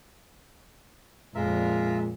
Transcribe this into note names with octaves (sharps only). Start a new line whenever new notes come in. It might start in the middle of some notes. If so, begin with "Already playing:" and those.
F2 A#2 G#3 F4 A#4 E5